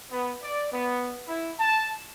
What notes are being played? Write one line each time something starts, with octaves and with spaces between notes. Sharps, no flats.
B3
D5
B3
E4
A5